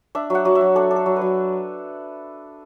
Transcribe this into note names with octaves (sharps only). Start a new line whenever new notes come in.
D4 E5
F#3 F#5
F#3
E5
F#3
D4 A4
D4
A4
F#3
B4
F#3